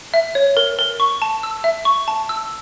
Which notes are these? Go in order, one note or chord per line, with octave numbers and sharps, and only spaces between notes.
E5
C#5
A#4
A#4
C#6
A5
E6
E5
C#6
A5
E6